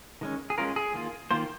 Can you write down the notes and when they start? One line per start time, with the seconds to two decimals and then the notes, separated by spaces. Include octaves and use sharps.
0.21 D#3 G#3 C#4
0.50 G#4
0.58 G#3 C#4 F4 A#4
0.76 G#4
0.94 D#3 A#3 F4
1.31 D#3 A#3 F4 C5